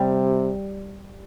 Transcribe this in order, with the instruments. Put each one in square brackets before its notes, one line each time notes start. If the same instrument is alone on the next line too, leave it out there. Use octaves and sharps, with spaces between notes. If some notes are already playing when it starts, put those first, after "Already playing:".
Already playing: [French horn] C3 [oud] G3